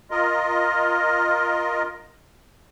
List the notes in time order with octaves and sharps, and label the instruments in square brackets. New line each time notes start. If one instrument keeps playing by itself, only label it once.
[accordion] F4 A#4 D#5